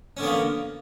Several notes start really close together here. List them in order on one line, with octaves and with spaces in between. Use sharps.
C#4 D3 B3 A#3